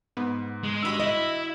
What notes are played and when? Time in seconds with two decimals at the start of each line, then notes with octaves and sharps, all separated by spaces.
0.17 G#2 B3
0.63 G#3
0.83 G2 D#3 F#4 B5 E6
1.00 E4 D#5 B5